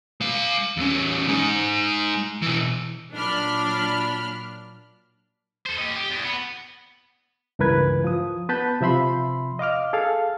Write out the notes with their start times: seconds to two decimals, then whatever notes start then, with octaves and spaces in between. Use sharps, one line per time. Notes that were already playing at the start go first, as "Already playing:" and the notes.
0.21 G#3 F5
0.77 E2 C#4
1.28 G#3 D#4
2.42 B2 E3
3.13 A#2 F#3 D4 B5 F6
5.66 A4 C5
5.78 G4 D#5
5.96 G4
6.10 E2
6.25 B3
7.59 C#2 G2 E3 A#4 B4 G#6
8.04 F3 D#6
8.49 B3 B4 A5 B5 G6
8.81 C3 F3 E5 B5 C6
9.59 D#5 F5 D6 F6
9.93 G#4 A4 F5 F6